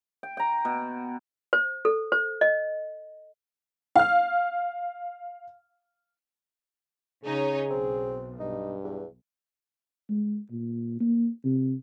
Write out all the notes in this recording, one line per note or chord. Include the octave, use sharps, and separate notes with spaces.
G5
G5 A#5
B2
C5
A4
C5
D#5
F5 F6
C#3 D#4 G#4 C#5
B1 C4
G2 D#4
E2
G#3
A#2
A#3
C3